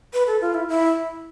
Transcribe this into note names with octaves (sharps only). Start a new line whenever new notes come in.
B4
A4
F4
E4
E4